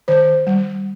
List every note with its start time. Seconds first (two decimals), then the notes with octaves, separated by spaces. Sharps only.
0.08 D#3 C5
0.47 G3